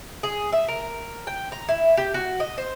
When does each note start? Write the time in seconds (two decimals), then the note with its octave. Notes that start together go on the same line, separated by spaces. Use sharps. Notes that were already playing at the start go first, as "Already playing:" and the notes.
0.23 G#4
0.52 E5
0.68 A#4
1.27 G5
1.52 A#5
1.69 E4
1.97 G4
2.14 F#4
2.40 D#5
2.58 C5